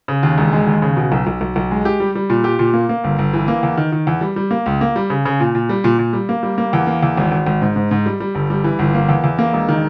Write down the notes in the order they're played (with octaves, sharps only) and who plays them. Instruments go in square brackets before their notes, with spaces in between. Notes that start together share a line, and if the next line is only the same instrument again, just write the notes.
[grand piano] C#3
D#2
E1
G#3
D#2
C#3
B2
B1
B1
B1
B1
G#3
G4
G3
G3
A#2
G4
A#2
A#3
A#3
G1
G1
E3
A#3
E2
D#3
D#3
E2
G3
G3
A#3
C#2
A#3
G3
C#3
C#3
A#2
A#2
G3
A#2
A#2
G3
A#3
G3
A#3
E2
A#3
E2
G#1
G#1
G#1
G#2
G#2
G#2
G3
G3
G1
G3
E3
G1
A#3
E2
E2
A#3
E1
D#3